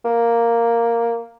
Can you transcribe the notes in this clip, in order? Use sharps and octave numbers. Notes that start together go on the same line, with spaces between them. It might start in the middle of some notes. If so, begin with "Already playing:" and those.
A#3